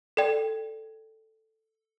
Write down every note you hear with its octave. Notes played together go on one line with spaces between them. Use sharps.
A4 D5 G5